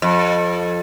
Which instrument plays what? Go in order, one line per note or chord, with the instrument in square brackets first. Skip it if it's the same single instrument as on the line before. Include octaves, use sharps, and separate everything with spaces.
[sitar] F2